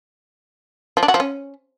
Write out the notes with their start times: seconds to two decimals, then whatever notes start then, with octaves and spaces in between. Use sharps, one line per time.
0.97 F3
1.03 D4
1.08 F#4
1.14 F3
1.20 C#4